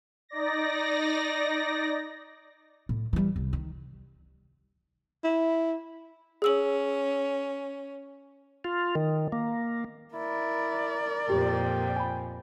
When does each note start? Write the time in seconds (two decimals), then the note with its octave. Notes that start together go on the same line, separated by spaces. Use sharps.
0.29 D#4 D5 A#6
2.89 A2
3.13 E3 G3
3.36 C2
3.53 D#3
5.24 E4
6.42 C#4 G#4 E6 F#7
8.64 F4
8.95 D#3
9.32 A#3
10.15 E4 A#4 D5
11.30 F2 A#2 G4 G5
11.96 G#5 B5